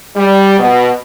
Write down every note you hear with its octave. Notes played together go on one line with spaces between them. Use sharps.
G3
B2